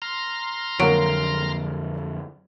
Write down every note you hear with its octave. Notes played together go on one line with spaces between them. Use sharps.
A#5 C6 F6
F2 D3 F#3 A#3 D7